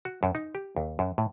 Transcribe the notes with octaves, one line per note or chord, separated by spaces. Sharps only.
F#4
F#2
D#4
G4
D#2
F#2
A2